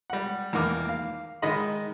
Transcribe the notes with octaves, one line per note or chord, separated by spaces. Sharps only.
G3 F#5
E2 D#3 A#3 D6 F6
F5
D#3 G#3 D#5 B5